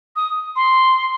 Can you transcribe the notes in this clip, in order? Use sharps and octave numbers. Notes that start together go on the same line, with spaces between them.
D#6
C6